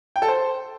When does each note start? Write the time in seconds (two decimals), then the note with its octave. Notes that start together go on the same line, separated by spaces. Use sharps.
0.16 G5
0.22 A4
0.28 C5